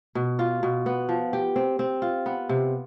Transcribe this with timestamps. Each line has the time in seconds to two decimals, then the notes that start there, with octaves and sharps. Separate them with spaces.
0.15 B2
0.39 F4
0.63 B2
0.86 B3
1.09 F3
1.33 G4
1.56 C4
1.79 C4
2.02 F4
2.26 B3
2.49 C3